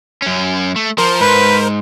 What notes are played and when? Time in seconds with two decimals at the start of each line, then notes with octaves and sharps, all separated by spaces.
0.22 F#2 C#4
0.76 A3
0.98 F3 A#4 C5
1.20 G#2 B4